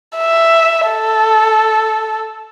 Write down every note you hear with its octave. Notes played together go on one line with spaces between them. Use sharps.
E5
A4